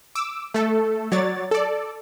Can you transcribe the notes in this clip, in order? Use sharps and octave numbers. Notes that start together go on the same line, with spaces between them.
D6 E6
A3 A4
F#3 C#5 D5 A6
A4 D5